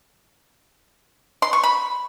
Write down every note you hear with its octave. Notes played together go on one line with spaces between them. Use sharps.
C6
C#6
B5